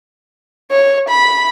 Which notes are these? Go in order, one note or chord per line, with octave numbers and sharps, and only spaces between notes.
C#5
B5